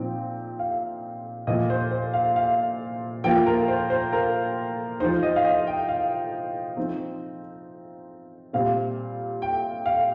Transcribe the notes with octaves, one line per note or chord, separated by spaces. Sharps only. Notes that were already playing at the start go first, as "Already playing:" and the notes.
Already playing: A#2 F3 C4 D#4 G5
F5
A#2 F3 A#3 F4 D#5
C5
C5
F5
F5
F3 A#3 F4 G5
A#4
C5
C5
A#4
F3 D#4 C5
D#5
F5
D#5
G5
F5
F3 C4 D#4
A#2 G3 C4 F5
G5
F5